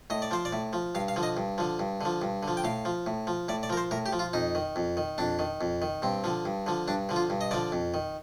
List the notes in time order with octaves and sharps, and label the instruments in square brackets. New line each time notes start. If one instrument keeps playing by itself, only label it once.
[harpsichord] A2 D#5
D5
F3 C5
D5
A2
F3
G2 F5
F5
D3 F3
D#5
G2
D3 F3
G2
D3 F3
G2
D3 F3
G5
A2 F5
F3
A2
F3
A2 D5
D5
F3 A#4
C5
A2 A#4
G4
F3
F4
F2 D#4
D#3
F2
D#3
F2 D4
D#3
F2
D#3
G2 C4
D3 F3
G2
D3 F3
G2 D4
D3 F3
F4
G2
D#5
D3 F3 D5
F2
D#3